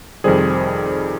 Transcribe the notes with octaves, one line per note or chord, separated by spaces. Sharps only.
F2 C3 D#3 G3 G#4 C5